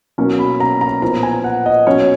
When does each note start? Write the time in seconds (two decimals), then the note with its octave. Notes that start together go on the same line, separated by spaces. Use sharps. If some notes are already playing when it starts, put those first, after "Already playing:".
0.18 B2 F#3 A#3 C#4
0.39 B5
0.60 A#5
0.81 A#5
1.02 A#2 F3 B3 A#5
1.23 G#5
1.44 F#5
1.66 D#5
1.86 B2 F#3 C#4 C#5